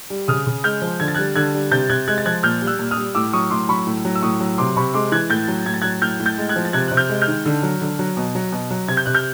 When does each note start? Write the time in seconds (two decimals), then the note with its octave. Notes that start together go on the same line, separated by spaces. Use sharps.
0.10 G3
0.28 C#3 D#6 F6
0.47 C#3
0.64 G#3 F6 G6
0.82 F3
1.00 D3 G#6
1.08 A6
1.15 G3 F#6 G#6
1.36 D3 F#6 G#6
1.54 G3
1.71 C3 G6 A6
1.89 C3 F#6 G#6
2.08 G#3 F#6 G#6
2.18 A6
2.25 F3 F#6 G#6
2.43 A#2 F6 G6
2.61 G3
2.67 E6 F#6
2.79 A#2
2.91 D#6 F6
2.97 G3
3.15 A2 D6 E6
3.33 F#3 C#6 D#6
3.51 A2 C6 D6
3.69 F#3 B5 C#6
3.87 A2
4.05 F#3
4.15 E6
4.22 A2 C#6 D#6
4.40 F#3
4.58 C3 C6 D6
4.76 C3 B5 C#6
4.94 G#3 C6 D6
5.12 E3 F#6 G#6
5.30 A2 G6 A6
5.48 F#3
5.66 A2 G#6
5.74 A6
5.82 F#3 F#6 G#6
6.02 A2 F6 G6
6.20 A2
6.26 G6 A6
6.38 G#3
6.49 F#6 G#6
6.56 F3
6.65 A6
6.73 C3 F#6 G#6
6.88 C3 F#6
6.97 F6 G6
7.09 G#3
7.22 F6 G6
7.27 D#3
7.46 D3
7.63 F#3
7.81 D3
7.99 F#3
8.17 B2
8.35 F#3
8.52 B2
8.70 F#3
8.88 C3 G#6
8.97 G6
9.06 C3 F#6
9.14 F6 G6